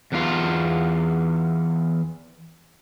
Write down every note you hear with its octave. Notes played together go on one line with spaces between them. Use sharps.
E2 F4